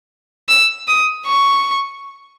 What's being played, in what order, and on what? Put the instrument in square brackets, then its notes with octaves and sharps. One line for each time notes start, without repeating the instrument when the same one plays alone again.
[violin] E6
D#6
C#6